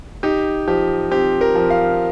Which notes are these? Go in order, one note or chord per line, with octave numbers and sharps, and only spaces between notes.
D#4 G4
F3 G4
C4 G4
A#4
F3
F5